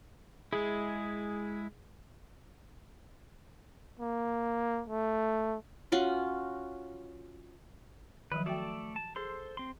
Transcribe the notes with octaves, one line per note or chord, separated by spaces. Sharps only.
G#3 E4 G#4
A#3
A3
C#4 F4 F#4
D#3 F3 F#3 B4
A3 F#4 A4 D5 E5 G5
A5
G#4 A4 C5 C6
C4 C6